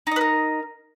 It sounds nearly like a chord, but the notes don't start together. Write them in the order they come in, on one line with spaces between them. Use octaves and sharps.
D#4 D#5 B4 A#4